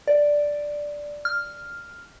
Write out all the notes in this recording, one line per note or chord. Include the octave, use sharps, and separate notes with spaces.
D5
F6